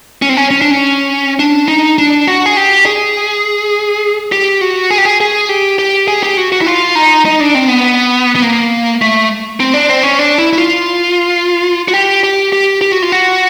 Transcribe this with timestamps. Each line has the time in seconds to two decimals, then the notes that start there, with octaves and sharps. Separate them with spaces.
0.22 C#4
0.29 C4
0.37 C#4
0.51 C#4
0.62 D4
0.71 C#4
1.39 D4
1.68 D#4
1.98 D4
2.27 F#4
2.46 G#4
2.57 G4
2.86 G#4
4.32 G4
4.61 F#4
4.91 G#4
4.98 G4
5.05 G#4
5.21 G#4
5.49 G4
5.79 G4
6.08 G#4
6.23 G4
6.37 F#4
6.52 F#4
6.61 E4
6.67 F4
6.95 D#4
7.25 D#4
7.40 D4
7.55 C4
7.69 B3
8.36 B3
8.42 A#3
9.02 A3
9.60 C4
9.74 D4
9.89 C4
10.03 C#4
10.19 D4
10.38 E4
10.53 E4
10.58 F4
11.88 F#4
11.94 G4
12.23 G4
12.53 G4
12.81 G4
12.92 F#4
13.02 F4
13.12 F#4